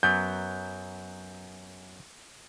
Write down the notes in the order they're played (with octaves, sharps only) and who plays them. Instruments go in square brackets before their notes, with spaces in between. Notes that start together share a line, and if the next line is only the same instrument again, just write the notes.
[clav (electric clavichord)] F#2 F#3 B3 [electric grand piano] G6